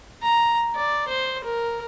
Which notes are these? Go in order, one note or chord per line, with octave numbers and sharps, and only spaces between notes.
A#5
D5
C5
A#4